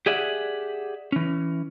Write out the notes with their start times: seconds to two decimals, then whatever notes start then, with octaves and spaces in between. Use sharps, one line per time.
0.06 G4 G#4 D5 E5 F#5
1.12 E3 C#4